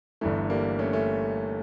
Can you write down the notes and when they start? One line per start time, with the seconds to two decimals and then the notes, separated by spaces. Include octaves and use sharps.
0.21 G1 G2 E3 A3
0.50 G3 A#3
0.79 A3 C#4
0.93 A3 C#4